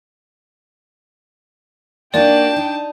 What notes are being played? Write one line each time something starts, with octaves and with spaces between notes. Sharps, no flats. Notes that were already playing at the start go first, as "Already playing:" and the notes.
A#3 D4 D#4 F#4 D5 G5 A5
D#4